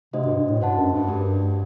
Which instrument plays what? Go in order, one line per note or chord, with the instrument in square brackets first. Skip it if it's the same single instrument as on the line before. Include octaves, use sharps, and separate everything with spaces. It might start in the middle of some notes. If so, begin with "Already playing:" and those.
[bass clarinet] C3 [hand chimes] A3 D4 F#4 C5 D#5
[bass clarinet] G2
G2
A2
[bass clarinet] G2 [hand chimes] F#4 C5 F#5 A5
[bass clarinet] F#2
G2
[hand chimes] A3 D4 G4